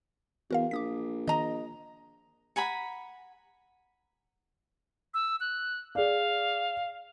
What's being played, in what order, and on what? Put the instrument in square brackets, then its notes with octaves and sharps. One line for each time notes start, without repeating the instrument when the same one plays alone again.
[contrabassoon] E2 [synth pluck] F#4 A#4 F5
[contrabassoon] A#1 [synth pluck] D6 D#6 B6
[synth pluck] D#3 [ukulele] D#5 A#5
[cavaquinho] F#5 G#5 A#5 B5
[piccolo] E6
F#6
[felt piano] G#4 D5 [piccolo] F5